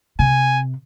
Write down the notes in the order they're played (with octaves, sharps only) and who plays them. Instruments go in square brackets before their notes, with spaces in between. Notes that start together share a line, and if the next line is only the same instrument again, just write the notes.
[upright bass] C3 [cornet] G#5